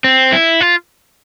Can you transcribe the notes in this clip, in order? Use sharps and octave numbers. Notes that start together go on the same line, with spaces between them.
C4
E4
F4